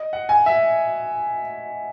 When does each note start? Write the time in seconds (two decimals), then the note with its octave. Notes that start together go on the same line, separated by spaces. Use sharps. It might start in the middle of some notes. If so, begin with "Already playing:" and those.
Already playing: D#5
0.13 F#5
0.29 G#5
0.46 E5